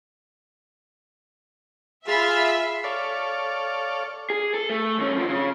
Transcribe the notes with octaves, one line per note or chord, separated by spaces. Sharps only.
F4 G#4 E5 B5 E6 F6
A4 C#5 D5 F5
G#4
A4
A3
D#2 C#4
F#2 F3
C#3 C#4